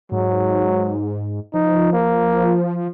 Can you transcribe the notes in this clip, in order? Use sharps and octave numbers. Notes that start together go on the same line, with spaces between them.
G#2 F#3
F3 D#4
A#3